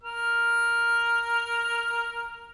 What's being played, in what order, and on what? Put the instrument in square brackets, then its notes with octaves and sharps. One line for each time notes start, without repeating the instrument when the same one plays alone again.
[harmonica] A#4 F6